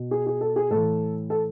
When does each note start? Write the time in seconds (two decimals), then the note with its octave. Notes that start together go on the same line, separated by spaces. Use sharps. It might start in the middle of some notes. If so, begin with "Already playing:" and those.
Already playing: B2
0.11 G#4
0.26 G#4
0.41 A4
0.56 G#4
0.70 A2 E3 A4
1.30 A4